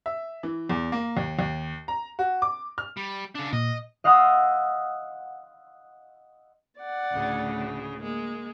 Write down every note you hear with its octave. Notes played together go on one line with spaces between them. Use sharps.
E5
E3
E2
A#3
D#2
D#2
A#5
F#4
D6
F6
G3
C#3 D4
A#2 D#5
D#5 F5 F#5 C6 D#6 E6
D5 F#5
D2 A2 C#3
G#3 A#3